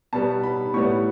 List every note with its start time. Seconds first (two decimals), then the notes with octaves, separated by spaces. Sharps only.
0.13 B2 G3 B3 A5
0.43 B5
0.74 A2 G3 B3 C#6